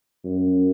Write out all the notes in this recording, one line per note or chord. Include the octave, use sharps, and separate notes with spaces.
F#2